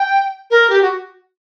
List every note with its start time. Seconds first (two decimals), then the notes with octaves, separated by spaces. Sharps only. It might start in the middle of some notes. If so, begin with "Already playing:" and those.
Already playing: G5
0.51 A#4
0.70 G4
0.82 F#4